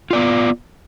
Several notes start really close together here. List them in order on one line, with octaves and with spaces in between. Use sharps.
F4 D5 B3